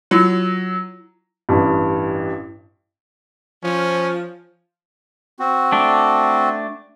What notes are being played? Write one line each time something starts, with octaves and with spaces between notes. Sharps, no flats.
F#3 E4 F4
A1 G2
F3 C#4
C4 F#4
A3 D4